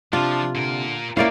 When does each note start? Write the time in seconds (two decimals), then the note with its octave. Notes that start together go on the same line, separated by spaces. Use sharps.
0.13 C3 F3 D4 F4
0.55 A#2 D3 A#4
1.17 C#2 A#3 C#4 E4 D5 F5